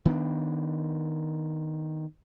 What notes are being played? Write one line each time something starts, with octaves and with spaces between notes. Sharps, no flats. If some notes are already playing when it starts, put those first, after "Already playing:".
D#3 B3 C#4 D4